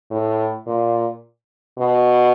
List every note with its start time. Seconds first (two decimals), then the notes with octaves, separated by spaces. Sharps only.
0.10 A2
0.66 A#2
1.78 B2